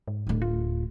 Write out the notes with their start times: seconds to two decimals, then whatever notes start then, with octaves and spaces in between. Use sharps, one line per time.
0.08 G#2
0.27 D1 E4
0.42 F4